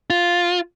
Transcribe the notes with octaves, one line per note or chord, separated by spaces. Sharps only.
F4